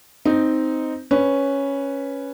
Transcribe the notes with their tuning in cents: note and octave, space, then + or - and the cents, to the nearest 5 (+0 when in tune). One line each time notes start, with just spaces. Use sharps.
C4 -5 D#4 +0
C#4 +0 B4 +0